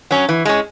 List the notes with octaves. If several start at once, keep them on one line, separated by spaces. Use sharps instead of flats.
F#3 C#4
E3
G#3 C#4